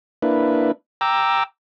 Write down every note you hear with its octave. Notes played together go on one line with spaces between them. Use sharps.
A#3 D4 E4 B4
G5 A#5 D6 E6